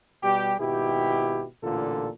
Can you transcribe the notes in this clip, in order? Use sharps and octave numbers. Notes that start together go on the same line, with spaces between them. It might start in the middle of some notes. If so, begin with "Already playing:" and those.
B2 G3 G4
G#1 B2 E4 G4
A1 A#2 D3 F4 A4